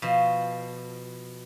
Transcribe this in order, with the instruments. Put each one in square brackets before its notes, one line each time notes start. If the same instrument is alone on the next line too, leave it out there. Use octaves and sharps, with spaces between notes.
[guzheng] B2 F3